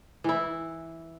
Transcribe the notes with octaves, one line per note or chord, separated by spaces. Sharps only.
E3 E4